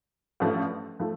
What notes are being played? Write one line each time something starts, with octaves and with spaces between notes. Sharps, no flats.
A1 G2 F3 A3
F3 A3